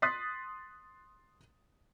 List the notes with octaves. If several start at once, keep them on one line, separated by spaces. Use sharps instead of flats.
C6 D#6 F#6 A6 B6 C7